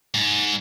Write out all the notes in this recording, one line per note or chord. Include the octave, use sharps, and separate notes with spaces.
G#2